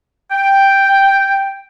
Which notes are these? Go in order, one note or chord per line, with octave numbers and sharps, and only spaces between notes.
G5